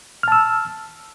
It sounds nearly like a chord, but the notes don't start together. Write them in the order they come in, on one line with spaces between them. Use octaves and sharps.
F6 A5 E6